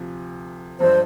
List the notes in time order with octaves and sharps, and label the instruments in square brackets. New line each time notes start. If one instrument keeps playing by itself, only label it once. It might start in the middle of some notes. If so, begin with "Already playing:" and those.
Already playing: [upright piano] D2 C3 F3
[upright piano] G2 F3 G#3 D4 [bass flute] C5